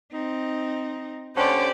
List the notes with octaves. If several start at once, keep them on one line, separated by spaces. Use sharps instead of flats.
C4 D#4
D3 C#4 G4 C5 D5